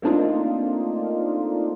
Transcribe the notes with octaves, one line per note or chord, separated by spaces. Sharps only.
A3 A#3 C4 D4 D#4 F4